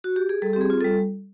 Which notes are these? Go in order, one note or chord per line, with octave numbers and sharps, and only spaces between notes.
F#4
G4
G#4
G3 A4
G4
C4 G#4
F4
A4
G3